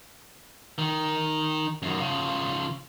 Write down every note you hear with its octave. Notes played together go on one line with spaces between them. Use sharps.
D#3
F#2 D#3
C#3 F3